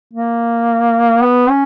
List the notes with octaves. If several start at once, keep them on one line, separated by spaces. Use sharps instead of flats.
A#3
B3
C#4